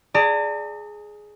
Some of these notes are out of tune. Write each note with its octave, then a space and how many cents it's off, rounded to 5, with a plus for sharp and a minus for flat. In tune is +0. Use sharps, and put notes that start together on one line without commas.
G#4 +10 D5 +0 A#5 -45